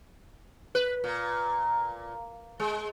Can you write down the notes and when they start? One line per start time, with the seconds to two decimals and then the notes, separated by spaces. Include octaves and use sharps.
0.75 B4
1.04 A#2
2.60 G#3